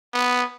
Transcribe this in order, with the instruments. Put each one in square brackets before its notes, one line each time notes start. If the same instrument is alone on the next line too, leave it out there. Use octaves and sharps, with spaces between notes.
[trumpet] B3